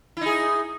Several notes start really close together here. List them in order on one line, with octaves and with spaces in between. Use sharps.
E4 D#4 G#4